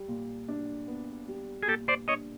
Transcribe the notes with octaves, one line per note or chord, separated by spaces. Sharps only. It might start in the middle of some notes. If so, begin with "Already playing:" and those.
Already playing: G3
A#2
D4
B3
G3
G#4
A#2 G4 A4
C5 D5
D4 C#5 D#5